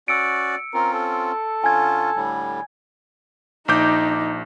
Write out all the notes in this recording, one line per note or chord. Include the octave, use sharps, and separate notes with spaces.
C#4 F#4 D5 E6 C#7 D7
C4 C#4 F4 A#4
A4
D3 C#4 F4 G#5 G#6
A2 D3 G3
A#1 D#4 D6 G6